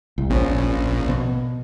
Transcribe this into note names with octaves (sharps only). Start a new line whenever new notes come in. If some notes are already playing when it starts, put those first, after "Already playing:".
C2
A#1 C4 C#4
B2